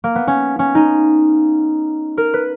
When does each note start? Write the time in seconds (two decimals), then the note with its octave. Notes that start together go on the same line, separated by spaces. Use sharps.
0.04 A#3
0.15 B3
0.27 C#4
0.59 C#4
0.75 D#4
2.17 A#4
2.34 B4